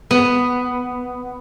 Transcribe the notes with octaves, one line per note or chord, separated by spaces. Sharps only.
B3